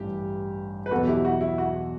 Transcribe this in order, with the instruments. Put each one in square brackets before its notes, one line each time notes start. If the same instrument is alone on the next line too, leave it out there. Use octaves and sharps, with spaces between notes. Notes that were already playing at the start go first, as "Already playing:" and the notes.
Already playing: [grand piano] A1 G2 E3 [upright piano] G4
[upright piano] B4
[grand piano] E2 B2 F#3 [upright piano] F#4 A4
[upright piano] E4 G4
F#4
E4
F#4